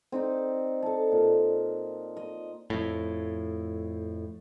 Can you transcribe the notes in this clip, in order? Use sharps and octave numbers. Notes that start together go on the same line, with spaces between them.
C4 D#4 D5
A4 A5
A#2
D#5
F2 A2